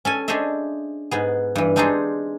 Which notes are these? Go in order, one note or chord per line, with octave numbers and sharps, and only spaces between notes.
C#4 A4 G#5
D4 G#4 C5 C#5 D#5 E5
G#2 B3 G#4
G2 E3
G#3 C4 D4 D#4 G#4